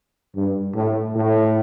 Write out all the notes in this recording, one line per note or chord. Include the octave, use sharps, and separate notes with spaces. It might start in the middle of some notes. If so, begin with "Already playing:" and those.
G2
A2
A2